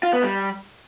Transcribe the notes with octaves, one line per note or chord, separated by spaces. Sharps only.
F4
B3
G3